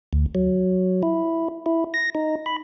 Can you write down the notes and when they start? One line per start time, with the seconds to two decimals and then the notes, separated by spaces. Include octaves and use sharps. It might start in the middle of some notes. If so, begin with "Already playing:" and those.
0.13 D2
0.35 F#3
1.03 E4
1.66 E4
1.94 A#6
2.15 D#4
2.46 B5